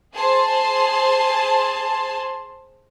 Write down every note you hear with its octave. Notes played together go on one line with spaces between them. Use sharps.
G#4 C5 A5 C6